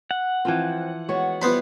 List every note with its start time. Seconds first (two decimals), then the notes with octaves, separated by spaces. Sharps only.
0.11 F#5
0.45 E3 F3 C4 F4
1.09 G#3 B3 F#4 C#5
1.42 G3 B3 E4 F4 C5 B5